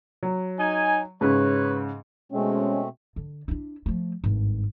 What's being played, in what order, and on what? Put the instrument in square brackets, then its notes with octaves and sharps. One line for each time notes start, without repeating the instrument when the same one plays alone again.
[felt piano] F#3
[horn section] D#4 G#5
[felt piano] G#2 C#3 [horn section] B4 C#5
[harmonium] B2 A3 C4 [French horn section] G#3 C#4
[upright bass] D3
D4 E4
F3 A3
G#1 G2